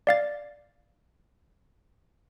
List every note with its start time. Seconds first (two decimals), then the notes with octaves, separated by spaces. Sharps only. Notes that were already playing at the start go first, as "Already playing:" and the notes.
0.07 D5 F5 A6